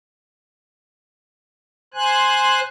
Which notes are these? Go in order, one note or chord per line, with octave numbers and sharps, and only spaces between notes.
C5 G#5 F#6